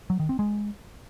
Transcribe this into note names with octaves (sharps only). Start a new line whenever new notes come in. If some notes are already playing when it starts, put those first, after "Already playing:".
F#3
D#3
C4
G#3